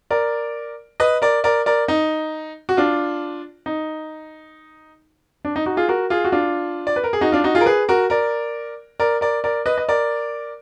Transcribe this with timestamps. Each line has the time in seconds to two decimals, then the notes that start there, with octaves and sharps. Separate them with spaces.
0.11 A#4 D5
1.00 B4 D#5
1.22 A#4 D5
1.44 A#4 D5
1.66 A#4 D5
1.88 D#4
2.69 F#4
2.77 D4 F4
3.66 D#4
5.45 D4
5.56 D#4
5.66 D#4 F#4
5.77 F4 G#4
5.88 F#4 A#4
6.10 F4 G#4
6.25 F#4
6.32 D4 F4
6.87 D5
6.96 B4
7.04 A#4
7.13 G#4
7.21 D#4 F#4
7.32 D4 F4
7.44 D#4 F#4
7.55 F4 G#4
7.61 A#4
7.66 G#4 B4
7.89 F#4 A#4
8.10 A#4 D5
9.00 A#4 D5
9.21 A#4 D5
9.44 A#4 D5
9.66 B4 D#5
9.78 D#5
9.88 A#4 D5